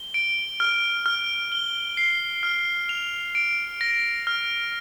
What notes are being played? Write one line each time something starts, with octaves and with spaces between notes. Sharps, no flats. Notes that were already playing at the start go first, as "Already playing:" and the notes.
Already playing: G7
D7
F6
F6
G7
C7
F6
F7
D7
A#6
F6